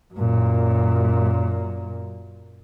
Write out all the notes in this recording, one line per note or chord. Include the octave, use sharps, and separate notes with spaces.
F#2 A#2